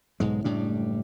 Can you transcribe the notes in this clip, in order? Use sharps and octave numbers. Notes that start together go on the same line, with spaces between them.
B1 G#2 G#3
F#1 A2 G3 D4